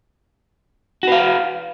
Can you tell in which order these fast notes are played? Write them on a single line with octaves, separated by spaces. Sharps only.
F#4 B4 F5